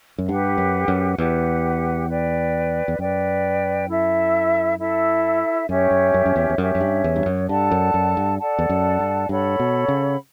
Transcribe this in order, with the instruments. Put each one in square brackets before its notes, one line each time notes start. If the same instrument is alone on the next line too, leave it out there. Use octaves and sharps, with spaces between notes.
[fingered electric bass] F#2
[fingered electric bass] G2 [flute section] G4 B4 F#5
[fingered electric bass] F#2
F#2
[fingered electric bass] E2 [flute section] G4 B4 F#5
[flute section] B4 D5 G5
[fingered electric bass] E2
[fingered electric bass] F#2 [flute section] B4 D5 G5
[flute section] E4 A4 E5
E4 A4 E5
[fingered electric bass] F#2 [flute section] C#4 G4 C#5 E5
[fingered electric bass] F#2
F#2
F#2
E2
E2
[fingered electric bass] F#2 [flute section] C#4 G4 C#5 E5
[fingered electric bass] F#2
G2
E2
G2
F#2
[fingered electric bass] G2 [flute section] A4 D5 F#5 A5
[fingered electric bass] F#2
F#2
G2
[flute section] A4 D5 F#5 A5
[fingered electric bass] E2
F#2
G2
[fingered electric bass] G2 [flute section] A4 C#5 F#5 B5
[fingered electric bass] B2
C#3